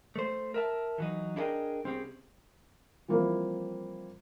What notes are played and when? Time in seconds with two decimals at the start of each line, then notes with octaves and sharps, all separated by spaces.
0.16 A3 C5
0.54 A#4 E5 A5
0.98 E3 F#3 D#4
1.36 D4 E4 G#4 A#4 D#5 G5
1.84 C2 C4 C#4 G4 G#4
3.08 E3 F3 G3 A#3 C4 E4